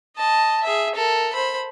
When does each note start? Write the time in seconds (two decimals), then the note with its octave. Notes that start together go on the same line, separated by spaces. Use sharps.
0.17 D#5 A5
0.63 G#4 E5
0.95 A4 A#4
1.33 C5 B5